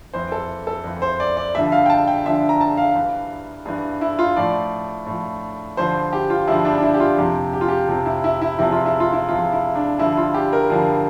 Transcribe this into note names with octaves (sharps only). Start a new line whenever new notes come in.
F2 E3 C5
A4
A4
F2 E3
C5
D5
D5
G2 D3 F3 E5
F5
G5
A5
G5
G2 D3 F3 E5
A#5
A5
F5
G2 E3
G2 E3
E4
F4
A2 F3 D5
A2 F3
G2 D3 F3 C5
G4
F4
G2 D3 F3 E4
D4
D4
E4
G4
F4
F2 C3 F3 G4
G4
F4
G4
F2 C3 F3
E4
E4
E4
E2 C3 F3 E4
F4
E4
F4
E4
E2 C3 F3 F4
E4
D4
G2 D3 F3 E4
F4
G4
A#4
G2 D3 F3